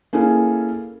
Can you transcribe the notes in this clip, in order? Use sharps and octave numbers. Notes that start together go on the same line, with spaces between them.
A#3 C#4 E4 G#4 A4